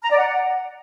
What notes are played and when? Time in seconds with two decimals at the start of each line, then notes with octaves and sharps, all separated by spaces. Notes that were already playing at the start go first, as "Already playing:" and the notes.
0.03 A#5
0.10 D5
0.18 F#5